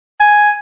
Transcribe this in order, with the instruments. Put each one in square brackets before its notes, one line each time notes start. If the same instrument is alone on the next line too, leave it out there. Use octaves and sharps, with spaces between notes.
[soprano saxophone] G#5